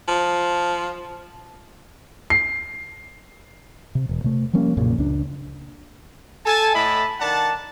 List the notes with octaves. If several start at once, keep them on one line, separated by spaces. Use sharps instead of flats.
F3
C7
C3
E1
C3 A3
F3 G3 A#3 C#4
B1 F#2 A#2 C#3
C#2 D4
A4 G#5 A5
A2 E4 D#5 A5 B5
D#3 D4 F#5 A5